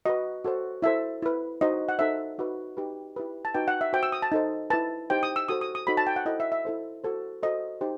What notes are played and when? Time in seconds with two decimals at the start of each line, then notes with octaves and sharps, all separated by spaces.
0.05 F#4 B4 D#5
0.45 F#4 A4 C5
0.82 E4 A4 C5 E5
1.22 E4 B4
1.61 D#4 F#4 C5 D#5
1.89 F#5
1.99 D#4 A4 C5 E5
2.38 D#4 F#4 B4
2.77 D#4 G4 B4
3.16 E4 G4 B4
3.45 A5
3.54 D#4 F#4 B4 G5
3.68 F#5
3.81 E5
3.93 F#4 C5 G5
4.03 E6
4.12 D#6
4.22 A5
4.32 D#4 A4 C5
4.70 E4 B4 A5
5.10 D#4 G4 C5 G5
5.23 D#6
5.36 E6
5.48 F#4 A4 C5 D#6
5.61 D#6
5.75 D#6
5.87 D#4 F#4 A4 C5 B5
5.97 A5
6.07 G5
6.16 F#5
6.26 E4 A4 C5 D#5
6.40 E5
6.52 E5
6.65 E4 A4 C5
7.04 F#4 A4 C5
7.43 F#4 A4 C5 D#5
7.81 D#4 G4 C5